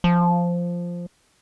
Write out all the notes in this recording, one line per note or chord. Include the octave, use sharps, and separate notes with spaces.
F3